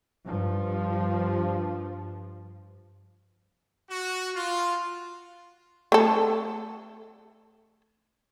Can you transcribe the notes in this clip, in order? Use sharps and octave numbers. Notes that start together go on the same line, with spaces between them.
G2 F3
F#4
F4
A3 A4